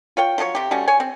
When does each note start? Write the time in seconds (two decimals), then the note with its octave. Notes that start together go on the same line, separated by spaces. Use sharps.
0.17 F4 C#5 G5
0.38 F3 F#3 D4 C#5
0.55 C3 G4
0.71 G3 A3 C#4 F#4
0.88 C#5 G#5
1.00 C4